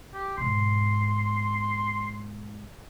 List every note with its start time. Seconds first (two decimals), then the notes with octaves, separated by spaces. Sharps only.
0.14 G4
0.38 G#2 B2 C6